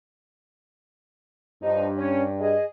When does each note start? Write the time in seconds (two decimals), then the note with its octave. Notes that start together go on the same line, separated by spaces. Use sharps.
1.62 G2 F3 D#4
1.98 C#4
2.39 G#4 D#5